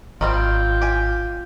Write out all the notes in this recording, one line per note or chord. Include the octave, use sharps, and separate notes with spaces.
G#1 D#3 G3 C4 F4 G5
G4 G#5